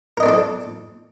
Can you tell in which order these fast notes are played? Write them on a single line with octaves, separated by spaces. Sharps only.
A#4 D#5 D4 C4 A4